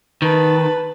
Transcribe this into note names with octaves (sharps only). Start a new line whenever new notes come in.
D#3 B4 A5